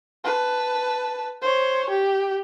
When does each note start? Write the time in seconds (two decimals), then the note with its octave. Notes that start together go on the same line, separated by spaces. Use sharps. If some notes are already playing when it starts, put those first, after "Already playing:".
0.25 B4 A5
1.42 C5 C#5
1.90 G4